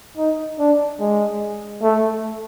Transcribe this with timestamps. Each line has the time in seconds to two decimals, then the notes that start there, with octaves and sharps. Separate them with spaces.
0.17 D#4
0.59 D4
1.00 G#3
1.82 A3